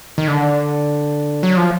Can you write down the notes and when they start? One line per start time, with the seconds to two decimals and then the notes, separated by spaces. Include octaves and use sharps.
0.18 D#3
0.28 D3
1.43 F#3
1.57 F3